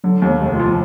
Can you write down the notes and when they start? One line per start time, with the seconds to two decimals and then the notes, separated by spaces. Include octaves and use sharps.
0.04 D3 F#3
0.22 D#2
0.29 G#3
0.41 F1
0.54 F4
0.59 F3